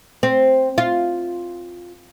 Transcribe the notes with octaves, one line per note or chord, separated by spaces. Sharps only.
C4
F4